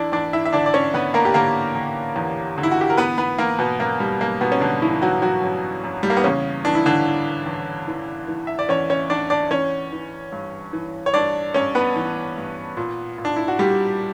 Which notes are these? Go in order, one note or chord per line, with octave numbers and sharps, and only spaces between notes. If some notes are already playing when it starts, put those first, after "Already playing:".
Already playing: E2 D4 E4 D5
E2 D4 D5
E4 E5
E5
D3 D4 D5
D5
C#4 C#5
D3 B3 B4
A#3 A#4
G4
D3 A#3 A#4
D3
E2
D3
E4
F#4
G4
A#4
E3 B3 B4
B3 B4
E3 A#3 A#4
B2 B3
F#2 A#3
G3
F#2 A#3
B2 B3
C#4
F#2 D3 D4
E3 E4
E3 F#3 F#4
F#3 F#4
F#2
F#2
G3
A#3
B3
E2 C#3 C#4
E3 D4
E4
D3 D4
E3
E2
E3
E3
E5
D5
E2 C#4 C#5
C#4 C#5
E2 D4 D5
D4 D5
E3 C#4 C#5
E3
G2
E3
C#5
G2 D4 D5
G2 C#4 C#5
B3 B4
E3
G2
A#2
A#2
D4
E4
F#4
A#2 G3 G4